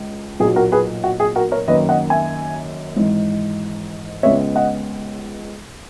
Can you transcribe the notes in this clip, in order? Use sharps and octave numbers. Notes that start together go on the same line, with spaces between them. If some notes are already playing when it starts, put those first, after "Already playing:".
Already playing: C#2
B1 A#2 F#3 A#3 G#4
F#4 A#4
G#4 B4
F#4
G#4
F#4 A#4
A#4 C#5
F#2 D#3 A#3 C#4 B4 D#5
D#5 F#5
E5 G#5
G#1 G#2 E3
C#2 C#3 G#3 B3 C#5 E5
D#5 F#5